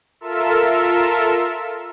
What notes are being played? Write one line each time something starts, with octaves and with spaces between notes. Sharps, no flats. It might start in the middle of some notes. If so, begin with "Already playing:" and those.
F4 A4 A#4 E5 E6